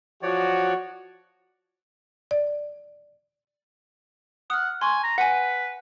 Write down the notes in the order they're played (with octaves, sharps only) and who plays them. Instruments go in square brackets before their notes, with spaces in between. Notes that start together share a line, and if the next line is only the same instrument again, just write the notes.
[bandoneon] F3 C#5 D5 [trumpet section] F#4
[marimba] D5
[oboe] F#5 [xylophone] D#6 F6
[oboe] G#5 [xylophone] C6 C#6
[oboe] A#5
[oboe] B4 [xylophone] F#5 G#5